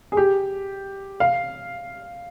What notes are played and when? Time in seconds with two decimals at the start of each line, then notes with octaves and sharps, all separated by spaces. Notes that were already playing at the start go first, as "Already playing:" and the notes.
0.12 G#4
0.17 G4
1.20 F5